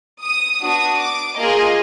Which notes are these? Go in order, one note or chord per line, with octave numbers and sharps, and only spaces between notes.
D#6
B3 D4 F#4 D#6
D6
A#3 F4 G#4 D#5